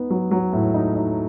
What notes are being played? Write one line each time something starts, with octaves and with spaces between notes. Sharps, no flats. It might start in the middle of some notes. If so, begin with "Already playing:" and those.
Already playing: B3 D#4
F#3
F#3
A2
D#4
D#4